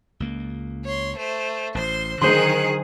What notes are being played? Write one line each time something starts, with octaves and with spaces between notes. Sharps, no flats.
C#2 A#3
C#5 C6
A3 C5
A1 C5 C6
D3 D#3 F#3 D4 G#4 C5 C6 F#6